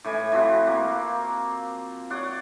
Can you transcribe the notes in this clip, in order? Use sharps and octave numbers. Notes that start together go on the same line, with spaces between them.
A2 E3 G#5
E3 F3 C4 F#4
A#3
C#5 D5 F#5 C6